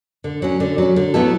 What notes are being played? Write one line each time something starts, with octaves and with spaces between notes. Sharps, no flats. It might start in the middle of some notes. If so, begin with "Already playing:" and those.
D3
F#3 C#4
D3
F#3 C#4
D3
F#3 B3 E4 A4